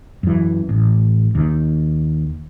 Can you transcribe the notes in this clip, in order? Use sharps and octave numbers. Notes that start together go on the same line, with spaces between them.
F#2 E3
A1
D#2 D#3